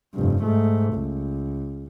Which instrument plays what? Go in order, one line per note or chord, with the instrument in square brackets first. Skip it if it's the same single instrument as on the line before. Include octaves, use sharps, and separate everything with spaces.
[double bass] F1 G2
G#2 A3
C#2